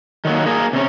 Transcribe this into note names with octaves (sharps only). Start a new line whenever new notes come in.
D#3 F#3 A#3
A#3 G#4 A#4
C3 C#4